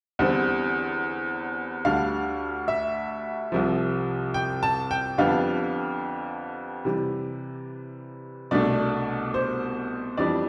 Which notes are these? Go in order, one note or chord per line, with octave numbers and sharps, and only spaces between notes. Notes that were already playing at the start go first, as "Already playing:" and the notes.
E2 D3 G3 C4
D2 D3 G3 D4 F5
E5
C2 C3 F3
G5
A5
G5
F2 D3 G3 B3 D4 F5
C3 E3 G3
C2 B2 A3 D4 D5
C5
F2 E3 G3 D4 D5